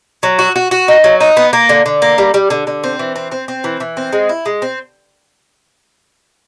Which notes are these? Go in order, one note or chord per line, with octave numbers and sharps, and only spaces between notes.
F#3
F#4
F#4
F#4
D#4
F#3
D#4
B3
A#3
D3
D3
A#3
G3
G3
D3
D3
C4
E3
C4
C4
C4
E3
E3
C4
G#3
E4
G#3
C4